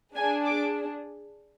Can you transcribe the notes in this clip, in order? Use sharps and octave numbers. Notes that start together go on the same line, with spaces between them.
D4 G#4 G#5
D6